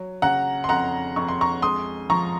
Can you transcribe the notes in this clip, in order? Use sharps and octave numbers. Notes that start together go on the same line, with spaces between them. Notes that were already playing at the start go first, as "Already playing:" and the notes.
Already playing: F#3
C#3 F#5 A#5
C6
F2 F#5 A#5
F2 C#6
C6
A#5 C#6
G#3 C6 D#6
F3 A#5 C#6